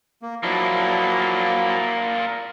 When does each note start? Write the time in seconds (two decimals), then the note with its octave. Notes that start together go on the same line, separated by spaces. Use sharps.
0.22 A#3
0.43 F3 F#3 A#3 D4 E4